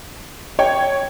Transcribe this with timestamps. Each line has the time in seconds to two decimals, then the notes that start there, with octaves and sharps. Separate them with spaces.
0.59 C#5 G5